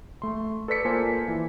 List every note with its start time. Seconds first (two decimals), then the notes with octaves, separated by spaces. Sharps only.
0.22 A3 C6
0.68 A4 B4 D5 B6 C#7
0.85 A#3 F4 A4 C5 G#5
1.28 E3